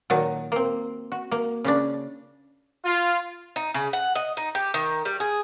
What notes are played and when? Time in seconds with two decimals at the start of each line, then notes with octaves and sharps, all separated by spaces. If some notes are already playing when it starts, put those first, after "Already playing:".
0.10 A#2 D#3 F#3 F#4 A5
0.52 A#3 C4
1.12 F#4
1.31 A#3
1.64 C#3 C#4 D4
2.84 F4
3.56 D#4
3.74 C#3
3.93 F#5
4.15 D#5
4.37 D#4
4.55 G4
4.74 D#3
5.05 G3
5.20 G#4